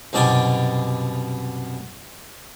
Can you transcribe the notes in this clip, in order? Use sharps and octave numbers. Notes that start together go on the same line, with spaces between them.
C2 F#2 B2 D5 G5 G#5